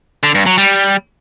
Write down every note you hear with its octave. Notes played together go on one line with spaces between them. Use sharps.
D3
G2
F#3
G3